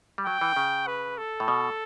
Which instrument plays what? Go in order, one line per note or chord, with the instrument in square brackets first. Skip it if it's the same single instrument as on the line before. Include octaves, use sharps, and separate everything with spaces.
[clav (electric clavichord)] G3
[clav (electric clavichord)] F#3 [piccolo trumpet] G5
[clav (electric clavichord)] E3
C#3
[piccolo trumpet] B4
A4
[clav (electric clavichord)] A2
B2